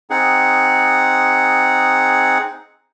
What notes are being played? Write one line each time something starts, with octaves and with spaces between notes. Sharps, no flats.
C4 D#4 G#4 F#5